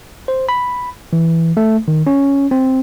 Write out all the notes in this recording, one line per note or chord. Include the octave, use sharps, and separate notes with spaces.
C5
B5
E3
A3
D#3
C#4
C4